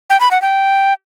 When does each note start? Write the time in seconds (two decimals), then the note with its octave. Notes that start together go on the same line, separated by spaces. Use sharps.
0.10 G5
0.20 B5
0.31 F#5
0.42 G5